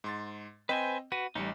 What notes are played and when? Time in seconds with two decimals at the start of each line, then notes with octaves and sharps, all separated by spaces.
0.04 G#2 C6 A6
0.69 C4 B4 C5 D#5 G5 G#5
1.12 F#4 B4 D#7
1.35 A1 G3 D#4 C#7